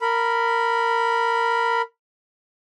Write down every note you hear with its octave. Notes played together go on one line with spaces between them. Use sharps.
A#4 B5